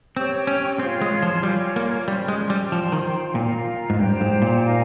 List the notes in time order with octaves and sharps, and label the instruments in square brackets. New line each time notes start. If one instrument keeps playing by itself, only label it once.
[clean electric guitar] C4 [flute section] G4 C#5 G5 C#6
[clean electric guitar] C#4
[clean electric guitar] C4 [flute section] F4 G#4 C#5 F5
[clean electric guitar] G#3
F3
[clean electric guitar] G3 [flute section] F4 A#4 C#5 G#5
[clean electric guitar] A#3
[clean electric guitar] G3 [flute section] C#4 G4 C5 D#5
[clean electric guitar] G#3
G3
[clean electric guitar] F3 [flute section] F4 C5 G5
[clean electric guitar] D#3
[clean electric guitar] A#2 [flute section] F4 A#4 F5 A#5
[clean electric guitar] G#2
[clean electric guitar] G2 [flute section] G4 C5 G5 A#5
[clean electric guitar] G#2
A#2
[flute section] D#4 A#4 F5 G#5